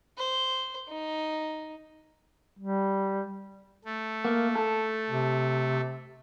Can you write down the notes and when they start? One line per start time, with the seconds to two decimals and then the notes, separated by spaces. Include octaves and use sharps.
0.17 C5
0.89 D#4
2.59 G3
3.85 A3
4.25 A#3
4.55 A4
5.10 C3